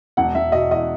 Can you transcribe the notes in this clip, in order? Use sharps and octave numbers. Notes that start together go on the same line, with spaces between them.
E1 F#5
E1 E5
B2 D#5
E2 D#5